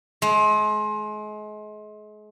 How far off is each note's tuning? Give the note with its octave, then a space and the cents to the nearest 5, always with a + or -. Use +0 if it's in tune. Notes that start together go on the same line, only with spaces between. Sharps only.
G#3 +35